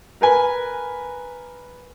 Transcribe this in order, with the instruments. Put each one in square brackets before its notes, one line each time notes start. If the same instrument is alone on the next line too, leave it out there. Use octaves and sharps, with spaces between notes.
[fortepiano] A#4 B4 G#5